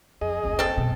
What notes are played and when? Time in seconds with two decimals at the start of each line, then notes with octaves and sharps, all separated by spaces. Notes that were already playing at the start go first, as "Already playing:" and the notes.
0.21 F2 G#4 D#5
0.43 F#1 D2
0.59 C4 A4
0.77 F#2 B2